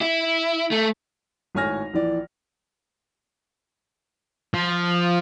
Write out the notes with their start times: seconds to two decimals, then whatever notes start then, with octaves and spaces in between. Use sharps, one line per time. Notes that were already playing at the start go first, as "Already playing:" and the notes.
0.01 E4
0.71 A3
1.55 G#1 A2 C#5 G#5 F6 A#6
1.93 A#1 E3 D5
4.54 F3